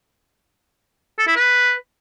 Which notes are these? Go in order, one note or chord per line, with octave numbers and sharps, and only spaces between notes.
A4
E4
B4